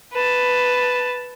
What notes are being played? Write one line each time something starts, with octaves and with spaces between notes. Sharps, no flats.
B4 A5